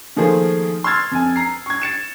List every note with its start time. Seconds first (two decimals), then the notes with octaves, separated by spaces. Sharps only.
0.16 D#3 F3 A3 A#3 G#4 C5
0.84 C6 E6 F6 G#6 A6
1.11 F2 G#5
1.36 A#5 C7
1.66 C#6 G#6
1.82 A6 C#7 E7